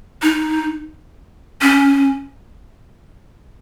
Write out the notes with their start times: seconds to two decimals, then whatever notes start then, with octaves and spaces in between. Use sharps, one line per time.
0.22 D#4
1.61 C#4